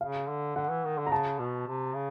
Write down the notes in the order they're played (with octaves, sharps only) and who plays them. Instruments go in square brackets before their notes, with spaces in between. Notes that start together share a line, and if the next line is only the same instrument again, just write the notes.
[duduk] C#3 [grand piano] F5
[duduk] D3
[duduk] D3 [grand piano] F#5
[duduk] E3
D#3
D3
[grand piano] A#5
[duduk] C#3 [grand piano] A5
[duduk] B2
C3
C#3